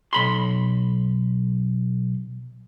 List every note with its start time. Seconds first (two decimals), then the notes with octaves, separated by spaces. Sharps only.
0.13 B1 B5 C6